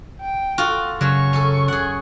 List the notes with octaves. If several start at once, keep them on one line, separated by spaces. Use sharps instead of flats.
G5
F4 F#4 A4
F#2 C#3 F#3 C#6
C#4 A4
G#4 F#5